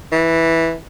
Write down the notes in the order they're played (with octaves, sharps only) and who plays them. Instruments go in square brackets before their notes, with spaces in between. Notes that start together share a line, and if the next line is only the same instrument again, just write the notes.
[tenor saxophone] E3